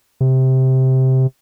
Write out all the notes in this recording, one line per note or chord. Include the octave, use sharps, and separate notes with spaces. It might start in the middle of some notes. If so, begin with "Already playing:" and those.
C3